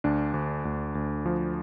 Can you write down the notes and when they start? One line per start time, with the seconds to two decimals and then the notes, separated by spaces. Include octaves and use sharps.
0.04 D2 D4
0.34 D2
0.65 D2
0.95 D2
1.26 F3